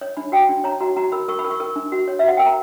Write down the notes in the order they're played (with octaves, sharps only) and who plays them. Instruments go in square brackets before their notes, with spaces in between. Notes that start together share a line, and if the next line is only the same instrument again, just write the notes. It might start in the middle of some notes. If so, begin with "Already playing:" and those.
[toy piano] C#5
D4 B5
F#4 G5
D4
C#5 A#5
F#4 A#5
F#4 A#5
A#4 B5
A#4 C#6
B5
A#4
C#6
A#4
D4
F#4
C#5
E5
F#4 F#5
A#4 G5
A#5